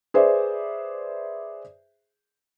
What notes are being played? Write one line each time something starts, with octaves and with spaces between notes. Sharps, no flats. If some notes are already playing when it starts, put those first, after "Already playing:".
G#4 B4 C5 D5 E5